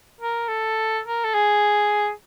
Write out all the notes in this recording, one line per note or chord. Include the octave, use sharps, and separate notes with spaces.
A#4
A4
A#4
A4
G#4